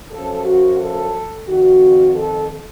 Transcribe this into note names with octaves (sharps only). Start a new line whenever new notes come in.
F#2 F3 A4
F#4
A4
F2 D#3 F#4
A4